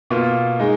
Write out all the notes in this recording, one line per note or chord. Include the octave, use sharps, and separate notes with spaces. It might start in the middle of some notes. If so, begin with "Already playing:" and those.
B2 A#3 F4
G#3 D#4